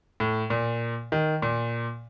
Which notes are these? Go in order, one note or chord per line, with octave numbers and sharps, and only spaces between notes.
A2
A#2
D#3
A#2